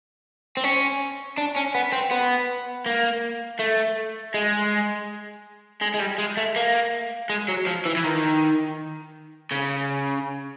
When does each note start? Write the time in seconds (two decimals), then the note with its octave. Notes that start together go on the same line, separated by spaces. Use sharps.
0.57 C4
0.64 C#4
1.37 D4
1.56 C#4
1.75 B3
1.93 C4
2.11 B3
2.86 A#3
3.60 A3
4.34 G#3
5.82 G#3
5.95 G#3
6.00 G3
6.19 G#3
6.37 A3
6.56 A#3
7.29 G#3
7.49 F#3
7.67 F3
7.85 E3
7.97 E3
8.04 D#3
9.52 C#3